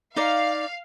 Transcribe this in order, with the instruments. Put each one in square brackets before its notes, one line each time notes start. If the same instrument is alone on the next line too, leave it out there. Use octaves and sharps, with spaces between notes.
[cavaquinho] D#4 D5 [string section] F5